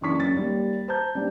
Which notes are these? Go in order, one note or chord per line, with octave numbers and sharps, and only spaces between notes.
F#1 E3 D4 C#6 B6
F#2 A6
D#2 G3
C5 A5 A#5 G6
G3 C4 D4